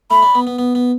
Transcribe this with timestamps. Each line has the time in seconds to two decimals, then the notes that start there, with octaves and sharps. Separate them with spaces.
0.11 A3 B5
0.23 D4
0.35 B3
0.47 B3
0.59 B3
0.75 B3